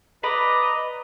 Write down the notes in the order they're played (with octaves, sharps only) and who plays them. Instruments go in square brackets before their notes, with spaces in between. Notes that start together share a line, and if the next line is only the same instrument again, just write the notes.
[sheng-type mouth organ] B4 D#5 A#5 [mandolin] D5 B5